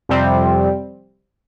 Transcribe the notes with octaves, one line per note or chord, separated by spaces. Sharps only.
F2 C3 G3 C4